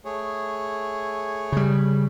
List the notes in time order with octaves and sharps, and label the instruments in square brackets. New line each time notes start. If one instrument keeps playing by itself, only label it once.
[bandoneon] A3 G#4 C#5
[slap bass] C#3 G3